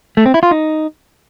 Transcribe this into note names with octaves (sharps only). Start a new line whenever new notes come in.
A3
C4
E4
F4
D#4